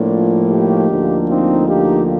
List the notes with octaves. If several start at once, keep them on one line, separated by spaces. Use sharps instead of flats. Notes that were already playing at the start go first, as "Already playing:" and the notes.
Already playing: A2 F3 A#3 D4 F4
D#4 G4
D2 D3 F3 A#3
C4 D#4
D#4 G4